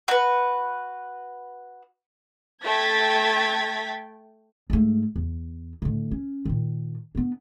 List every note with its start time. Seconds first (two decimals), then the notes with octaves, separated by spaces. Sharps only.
0.08 F#4 B4
2.64 A3 G5 G#6 A6 B6
4.70 G#2 A3
5.16 E2
5.82 A2 D3
6.11 C#4
6.45 A#2 D#3
7.15 B3 D4